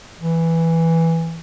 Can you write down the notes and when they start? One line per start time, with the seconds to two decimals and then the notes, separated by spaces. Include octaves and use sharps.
0.21 E3